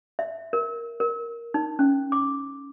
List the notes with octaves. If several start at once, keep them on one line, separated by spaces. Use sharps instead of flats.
E5
A#4
A#4
D#4
C#4
D6